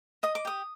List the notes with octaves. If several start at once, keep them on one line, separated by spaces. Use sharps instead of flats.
D#5 D#6
D6
G4 D#6